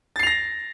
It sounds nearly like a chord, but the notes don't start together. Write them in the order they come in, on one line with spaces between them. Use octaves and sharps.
A6 C7 F7 A#6